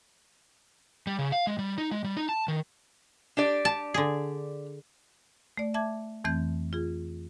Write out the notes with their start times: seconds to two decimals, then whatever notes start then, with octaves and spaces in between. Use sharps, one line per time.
1.07 G3
1.19 C#3
1.32 F5
1.47 G#3
1.59 G3
1.78 D#4
1.91 G#3
2.04 G3
2.17 D#4
2.29 A5
2.48 D#3
3.37 D4 G4 D5
3.65 A5
3.94 D3 G#4
5.57 A3 D5
5.74 E5 A5 D6 G#6
6.24 F2 E3 A3 C4 G6
6.73 F4 G#4